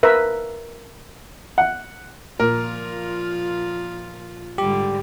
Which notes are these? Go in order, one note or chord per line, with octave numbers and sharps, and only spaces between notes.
A#4 B4 E5
F#5
A#2 F3 F4 A#4
G#2 D3 G3 G4